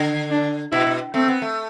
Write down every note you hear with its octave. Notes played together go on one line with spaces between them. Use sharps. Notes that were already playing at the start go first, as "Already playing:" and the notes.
Already playing: D3
D4
B2 E4
B2
A3 C4
B3
A3